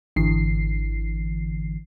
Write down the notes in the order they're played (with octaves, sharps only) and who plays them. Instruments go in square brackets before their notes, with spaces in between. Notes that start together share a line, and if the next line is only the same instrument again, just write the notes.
[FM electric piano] G#1 D3 E3 C7